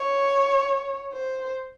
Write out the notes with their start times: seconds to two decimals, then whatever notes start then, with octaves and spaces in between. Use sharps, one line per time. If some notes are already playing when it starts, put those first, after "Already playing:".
Already playing: C#5
1.13 C5